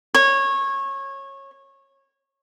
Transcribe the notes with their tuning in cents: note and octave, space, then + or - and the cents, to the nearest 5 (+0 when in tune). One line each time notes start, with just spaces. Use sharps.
C#5 -20